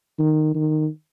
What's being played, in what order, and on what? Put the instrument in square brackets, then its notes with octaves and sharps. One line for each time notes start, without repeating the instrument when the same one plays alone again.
[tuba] D#3
D#3